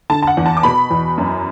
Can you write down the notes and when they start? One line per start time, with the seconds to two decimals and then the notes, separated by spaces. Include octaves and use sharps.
0.10 D3 A5
0.23 A5
0.27 F#5
0.37 E2
0.46 A5
0.57 D6
0.63 B2 B5
0.91 E2
1.18 F#2